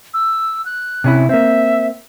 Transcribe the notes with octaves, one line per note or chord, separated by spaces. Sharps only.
E6
F#6
C3 C#4 E4
A#3 C4 E5